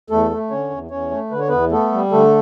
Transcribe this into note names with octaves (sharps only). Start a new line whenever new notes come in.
E2 A3 A4
A3
D3 C#4 C#5
E2
E2 C#4 C#5
A3
D3 B4
C#5
E2 B3 B4
A3 B3 A4
G3
D3 A3 A4